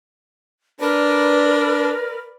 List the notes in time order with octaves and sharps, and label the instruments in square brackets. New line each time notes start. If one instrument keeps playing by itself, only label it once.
[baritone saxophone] D4 [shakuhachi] A#4 [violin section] B4 D5